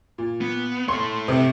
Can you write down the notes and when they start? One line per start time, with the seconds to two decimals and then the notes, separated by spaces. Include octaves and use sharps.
0.18 A#2
0.41 B3
0.88 A4 C#5 C6
1.28 C3